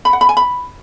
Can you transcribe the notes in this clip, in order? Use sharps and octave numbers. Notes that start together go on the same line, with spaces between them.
B5
F#5
B5
G#5
B5